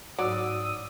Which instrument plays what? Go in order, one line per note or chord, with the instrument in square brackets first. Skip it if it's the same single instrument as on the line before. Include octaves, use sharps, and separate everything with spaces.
[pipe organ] G#2 E6 [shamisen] F#3 [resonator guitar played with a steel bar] D5 [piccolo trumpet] D#6